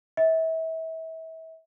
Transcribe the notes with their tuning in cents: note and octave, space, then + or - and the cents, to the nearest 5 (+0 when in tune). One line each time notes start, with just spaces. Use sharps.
E5 -35